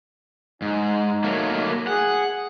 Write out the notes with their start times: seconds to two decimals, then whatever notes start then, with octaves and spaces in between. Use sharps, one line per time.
0.62 G#2 D#4
1.24 F#3 A3 A#3
1.87 G#4 F#5